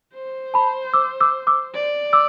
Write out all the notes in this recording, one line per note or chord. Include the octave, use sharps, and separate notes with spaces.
C5
A5 B5
D6 E6
D6 E6
D6 E6
D5
D6 E6